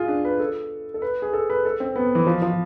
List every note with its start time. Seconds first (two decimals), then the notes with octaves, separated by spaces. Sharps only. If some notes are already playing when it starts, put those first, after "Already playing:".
Already playing: F4 G#4
0.08 D4
0.25 B4
0.40 A4
0.94 A4
1.02 B4
1.22 G#4
1.33 A4
1.50 B4
1.65 A4
1.80 C4
1.96 B3
2.15 E3
2.27 F3
2.42 F3